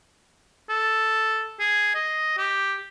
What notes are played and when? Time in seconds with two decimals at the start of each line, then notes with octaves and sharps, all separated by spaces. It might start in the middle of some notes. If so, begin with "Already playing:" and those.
0.69 A4
1.60 G#4
1.95 D#5
2.38 G4